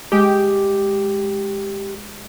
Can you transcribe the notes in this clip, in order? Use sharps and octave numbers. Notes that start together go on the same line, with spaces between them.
G#3 G4